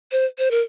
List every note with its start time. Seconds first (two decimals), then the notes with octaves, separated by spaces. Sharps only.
0.12 C5
0.38 C5
0.51 A#4